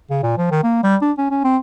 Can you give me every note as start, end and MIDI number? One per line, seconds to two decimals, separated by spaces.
0.10 0.18 49
0.23 0.35 46
0.38 0.48 53
0.51 0.63 51
0.63 0.83 58
0.83 0.96 55
1.02 1.12 62
1.18 1.26 61
1.31 1.42 61
1.44 1.57 60